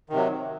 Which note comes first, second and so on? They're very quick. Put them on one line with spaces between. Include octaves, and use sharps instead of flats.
D#3 C3 F#3